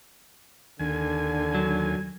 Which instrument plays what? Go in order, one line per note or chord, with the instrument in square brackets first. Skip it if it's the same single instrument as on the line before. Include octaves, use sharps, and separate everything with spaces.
[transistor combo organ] D#2 G#5 [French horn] D3 [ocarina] D4
[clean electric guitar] F#3